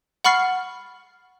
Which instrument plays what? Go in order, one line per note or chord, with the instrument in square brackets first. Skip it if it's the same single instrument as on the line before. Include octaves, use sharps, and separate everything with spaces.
[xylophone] F#5 B5 C#6 F6 A6 C7